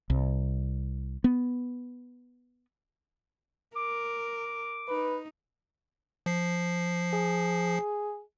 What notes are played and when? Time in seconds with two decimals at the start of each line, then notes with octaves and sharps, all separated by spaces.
0.10 C2
1.24 B3
3.76 A#4 D6
4.88 D#4 B4
6.26 F3 C7
7.13 G#4